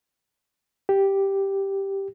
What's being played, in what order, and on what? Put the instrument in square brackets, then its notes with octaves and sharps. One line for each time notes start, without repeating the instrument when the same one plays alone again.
[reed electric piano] G4